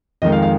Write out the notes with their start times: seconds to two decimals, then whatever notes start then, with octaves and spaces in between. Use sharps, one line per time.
0.22 F2 D#3 G#3 D#5
0.32 F5
0.42 F5